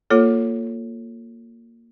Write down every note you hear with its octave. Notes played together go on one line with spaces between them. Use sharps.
A#3 F4 A4 C#5